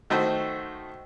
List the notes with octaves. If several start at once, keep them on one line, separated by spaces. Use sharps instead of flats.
D#3 A3 F#4 C5